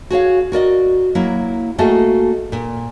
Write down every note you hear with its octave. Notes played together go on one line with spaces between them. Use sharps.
F#4 G#4 C#5 F5
F#4 A#4 D5 D#5
F#3 A#3 E4
A3 A#3 F#4 G#4 A4 D#5
A#2